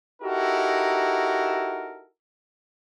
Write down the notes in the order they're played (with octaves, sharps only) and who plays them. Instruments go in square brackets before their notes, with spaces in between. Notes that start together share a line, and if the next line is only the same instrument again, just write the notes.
[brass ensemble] D#4 E4 F#4 G4 A4 A#4